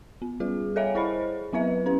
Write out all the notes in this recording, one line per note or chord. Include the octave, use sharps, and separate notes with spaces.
B3
G3 F4 G#4
A4 C#5 E5 F5 G#5
E4 G#4 C5 D#5 B5
F#3 B3 E4 B4 E5
C#4 B4